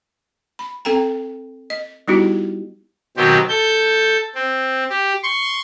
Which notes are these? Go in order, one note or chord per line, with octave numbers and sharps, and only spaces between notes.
B5
C4 A4 G5 A#5
D#5
G3 B3 D#4 E4 F#4 G4
B2 D#3 F#3 C4 G4
A4 G6
C4
G4
C6 C#6